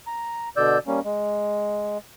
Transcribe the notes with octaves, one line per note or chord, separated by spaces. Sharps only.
A#5
B2 D3 D5 E6 G6
G3 A#3 C#4
G#3